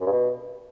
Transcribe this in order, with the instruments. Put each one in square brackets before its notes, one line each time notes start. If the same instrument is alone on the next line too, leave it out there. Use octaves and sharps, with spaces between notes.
[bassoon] F#2
G2
B2